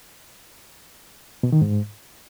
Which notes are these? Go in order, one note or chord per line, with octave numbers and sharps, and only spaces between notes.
B2
D#3
G#2